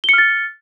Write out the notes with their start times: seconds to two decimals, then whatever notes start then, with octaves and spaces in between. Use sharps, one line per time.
0.04 G7
0.09 C#7
0.13 F6
0.18 A6